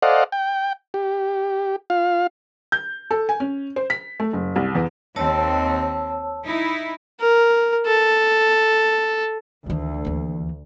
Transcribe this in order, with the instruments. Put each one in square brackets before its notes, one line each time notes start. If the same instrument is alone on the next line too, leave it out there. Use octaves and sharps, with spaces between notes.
[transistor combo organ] A4 C5 D5 D#5 F5 F#5
G5
G4
F4 F5
[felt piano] G6
A4
G#5
C#4
C5
B6
A3
F#1
C2
E2
[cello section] D#2 C4 [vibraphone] C#5 A5 E6
[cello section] D#4 E4
[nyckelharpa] A#4
A4
[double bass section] D2 [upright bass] D#3 E3
[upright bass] D#2 E3